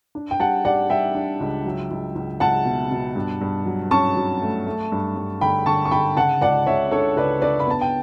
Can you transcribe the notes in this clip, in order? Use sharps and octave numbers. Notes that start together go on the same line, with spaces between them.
D4
G5
G3 F#5 A5
G3 D5 F#5
G3 E5 G5
D4
C#2
F#3
C#2
C#2
C#2 F#5 A5
B2
B2
G2
G2
F#3
C#4 A5 C#6
F#3
A3
A3
G2
G2
D3 G5 B5
D3 A5 C#6
C#6
D3 G5 B5
C#3 F#5 A5
C#2 D5 F#5
C#2 C#5 E5
D4 A4 C#5
C#2 B4 D5
D4 B4 D5
B5
B3 A5
G5